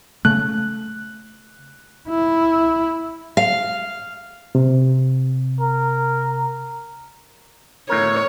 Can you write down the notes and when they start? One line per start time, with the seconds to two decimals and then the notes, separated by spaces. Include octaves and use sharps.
0.25 C#3 A3 F#6
2.09 E4
3.37 F5
4.55 C3
5.61 A#4
7.89 A2 A#4 C#5